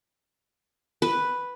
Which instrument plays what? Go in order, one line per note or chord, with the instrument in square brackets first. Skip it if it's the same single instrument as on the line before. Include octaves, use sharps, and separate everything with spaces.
[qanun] B4